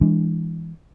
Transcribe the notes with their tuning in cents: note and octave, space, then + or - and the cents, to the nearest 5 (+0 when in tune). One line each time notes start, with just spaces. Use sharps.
E3 +0 G#3 -25 D4 +10